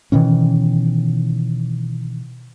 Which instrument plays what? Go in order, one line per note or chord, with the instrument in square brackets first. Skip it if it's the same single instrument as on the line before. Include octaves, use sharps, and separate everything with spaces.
[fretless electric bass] B2 D#3 E3 C#4